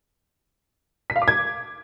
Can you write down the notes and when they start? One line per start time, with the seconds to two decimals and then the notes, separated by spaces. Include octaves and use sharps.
1.10 B6
1.16 F5
1.22 D6
1.28 G#6